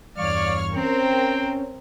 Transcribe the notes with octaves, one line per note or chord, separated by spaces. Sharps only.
E2 G2 C#5 D5 F5 C#6 F6
C4 C#4 A#4 C5 G5